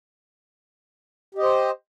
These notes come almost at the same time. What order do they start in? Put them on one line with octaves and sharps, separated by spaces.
G4 D#5 C5